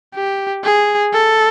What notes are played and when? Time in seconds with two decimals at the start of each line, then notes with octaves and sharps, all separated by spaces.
0.15 G4
0.64 G#4
1.14 A4